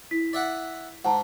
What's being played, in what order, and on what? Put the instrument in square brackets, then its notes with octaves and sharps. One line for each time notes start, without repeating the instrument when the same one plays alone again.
[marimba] E4 [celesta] B6
[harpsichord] D5 E5 F#5
[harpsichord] G#2 [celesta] F#5 A5 A#5